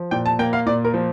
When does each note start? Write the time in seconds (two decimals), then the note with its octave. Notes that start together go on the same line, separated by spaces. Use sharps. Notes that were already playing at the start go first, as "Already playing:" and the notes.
Already playing: F3
0.11 A#2 G5
0.26 A5
0.39 A#3 G5
0.53 F5
0.66 A#2 D5
0.85 A#4
0.94 F3